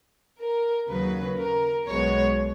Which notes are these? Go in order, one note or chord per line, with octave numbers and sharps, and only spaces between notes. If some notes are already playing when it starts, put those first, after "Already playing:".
A#4
D#2 C#3 F#3 B4
A#4
B1 B2 G#3 B3 C#5